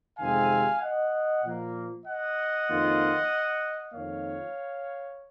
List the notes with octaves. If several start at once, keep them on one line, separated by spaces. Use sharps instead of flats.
F2 C3 D#3 G#3 C4 F5 G#5
D#5 F#5
A#2 F3 A#3
D#5 F#5
F2 D#3 A#3 F4
F2 D#3 A#3 C#5 F5